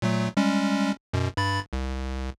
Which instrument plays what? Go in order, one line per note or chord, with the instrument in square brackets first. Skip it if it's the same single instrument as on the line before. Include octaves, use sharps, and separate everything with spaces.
[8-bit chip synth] A#2 F#3 A3
G3 G#3 C#4
F#2 B2
G2 B5 A6
C2